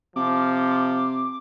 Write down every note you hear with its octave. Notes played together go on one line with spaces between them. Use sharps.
C3 F3 D6